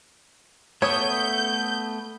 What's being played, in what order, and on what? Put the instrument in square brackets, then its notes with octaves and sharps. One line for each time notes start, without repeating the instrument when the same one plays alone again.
[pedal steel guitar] A3 B3 D#6 [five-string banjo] C#5 [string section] G6